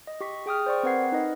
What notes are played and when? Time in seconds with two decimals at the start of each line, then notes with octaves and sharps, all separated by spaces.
0.07 D#5
0.21 G4 C#6 B6
0.46 G#4 G5 D#6 F6
0.66 C5 D5 C#6
0.83 C4 A#4 B4 F#5 G#6 C7
1.12 D#4 B4 D#5